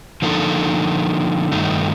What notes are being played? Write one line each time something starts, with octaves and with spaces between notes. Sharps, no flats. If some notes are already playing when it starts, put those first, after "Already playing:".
D3 F3 A#3 D#4 A4
G2 D#3 A3 D#4